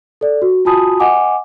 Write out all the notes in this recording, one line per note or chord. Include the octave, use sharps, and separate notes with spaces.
A4 D5
F#4
F4 F#4 G#5 A5 B5 D#6
D#5 F#5 G#5 D6